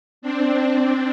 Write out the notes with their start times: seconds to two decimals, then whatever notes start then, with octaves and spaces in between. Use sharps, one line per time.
0.22 C4 D4
0.72 C4 D4